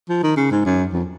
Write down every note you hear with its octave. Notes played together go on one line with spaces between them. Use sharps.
F3
D#3
C#3
G#2
F#2
F2